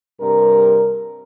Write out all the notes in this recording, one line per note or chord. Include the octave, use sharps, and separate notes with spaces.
G2 C3 A#4